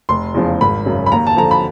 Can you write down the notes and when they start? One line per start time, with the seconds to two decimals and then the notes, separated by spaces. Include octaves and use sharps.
0.09 F1 C6
0.34 E2 C#3 F3
0.61 G#1 B5
0.86 F#2 C#3
1.06 B5
1.11 D#2 A#5
1.27 A5
1.36 D3 F3 A#5
1.51 B5